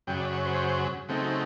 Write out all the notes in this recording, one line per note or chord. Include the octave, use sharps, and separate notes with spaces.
F#2 C#3 F#3 G5
D5
C#5
C5
C#3 F#3 A3 C4 D#4